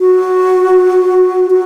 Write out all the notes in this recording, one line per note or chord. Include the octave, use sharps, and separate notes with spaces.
F#4
F#4